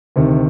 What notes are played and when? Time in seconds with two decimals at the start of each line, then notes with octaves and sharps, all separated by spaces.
0.16 D2 C3 D#3